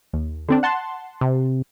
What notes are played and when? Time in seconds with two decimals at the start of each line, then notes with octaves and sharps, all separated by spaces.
0.13 D#2
0.49 D3 C4 D4
0.63 F#5 A5 C6
1.21 C3